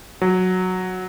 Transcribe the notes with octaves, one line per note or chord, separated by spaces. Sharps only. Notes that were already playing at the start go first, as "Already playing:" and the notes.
F#3